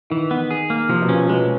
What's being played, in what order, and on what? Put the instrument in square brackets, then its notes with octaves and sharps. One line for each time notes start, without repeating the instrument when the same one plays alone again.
[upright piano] D#3 [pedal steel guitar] E3
[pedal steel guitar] B3
G#4
A#3
[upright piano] C3 [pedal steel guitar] F3
[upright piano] B2
[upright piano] A#2 [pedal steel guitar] C#4
[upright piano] B2 [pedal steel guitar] G#3